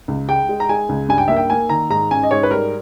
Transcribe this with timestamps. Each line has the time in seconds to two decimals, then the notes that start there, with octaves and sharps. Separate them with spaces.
0.08 C#2
0.28 G#3 G5
0.49 G#3
0.60 A#5
0.69 G#3 G#5
0.89 C#2
1.09 G2 G#5
1.18 G5
1.28 A#3 E5
1.36 G5
1.50 A#3 G#5
1.69 D#3 A#5
1.90 G#2 A#5
2.11 C#4 G#5
2.23 D#5
2.31 G#2 C#5
2.43 B4
2.51 G3 A#4